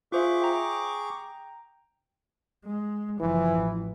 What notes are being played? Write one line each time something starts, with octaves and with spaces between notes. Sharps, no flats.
F4 G#4 C5 E5 C#6 D6
G5 A#5
G#3
F#1 E3 F3
A1